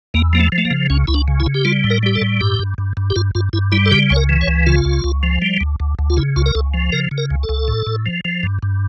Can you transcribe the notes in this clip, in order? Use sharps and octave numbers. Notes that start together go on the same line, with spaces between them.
E2 A#3
F3 A#3
A3
F3
A3
A#3
C#3
C#2 C#4
C#2 E4
D4
C#3
E4
C#3
G4
G3 F4
A2
A#4
G3 G4
A4
A2
G2 G4
G2
G2
G2
G4
G2 F4
G2 F4
G2 E4
G3 E4
A4
C#3 G4
C#2 C#5
A#4
E3
C#5
C#2
C#3 F4
C#2
C#2
F3
G3
D2
D2
D2
F4
C#3 E4
C#2 F4
A#4
C#2 A4
F3
C#3 A#4
C#3
A#4
C#2
A4
C#2
A2
A2
F3
F3
G2
G2